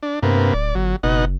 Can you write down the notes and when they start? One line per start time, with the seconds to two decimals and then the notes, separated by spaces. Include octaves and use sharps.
0.03 D4
0.23 G2 C3 A#3 B3
0.54 D1 D5
0.75 G1 F#3
1.03 F#1 B2 D#4 F#5